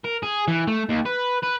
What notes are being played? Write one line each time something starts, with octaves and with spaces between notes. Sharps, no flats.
A#4
G#4
E3
A3
D#2
B4
B4